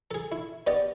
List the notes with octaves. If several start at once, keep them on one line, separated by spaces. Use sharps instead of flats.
G#4 A4
E4
B3 G4 D5 D#5